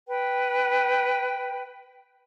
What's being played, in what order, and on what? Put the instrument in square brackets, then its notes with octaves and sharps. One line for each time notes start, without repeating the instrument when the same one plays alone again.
[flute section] B4 G5